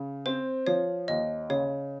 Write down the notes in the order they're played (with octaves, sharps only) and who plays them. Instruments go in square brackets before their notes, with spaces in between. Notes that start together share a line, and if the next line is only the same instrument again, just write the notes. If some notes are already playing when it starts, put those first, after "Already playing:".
Already playing: [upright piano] C#3
[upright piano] C4 [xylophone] C5
[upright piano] F3 [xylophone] C#5
[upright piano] D#2 [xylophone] D#5
[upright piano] C#3 [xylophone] C#5